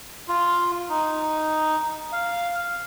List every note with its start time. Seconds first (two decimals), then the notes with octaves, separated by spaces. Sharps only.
0.28 F4
0.89 D#4
2.12 F5